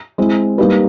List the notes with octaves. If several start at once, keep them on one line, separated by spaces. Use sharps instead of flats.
G#3 C4 E4
G3 A#3 D#4 G4 B4